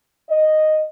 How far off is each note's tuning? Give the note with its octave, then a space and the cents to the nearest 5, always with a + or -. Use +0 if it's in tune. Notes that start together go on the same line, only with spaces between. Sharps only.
D#5 -5